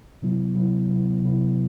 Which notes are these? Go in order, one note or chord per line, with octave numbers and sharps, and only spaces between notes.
C3 F#3 B3 E4
C3 F#3 B3 E4
C3 F#3 B3 E4
C3 F#3 B3 E4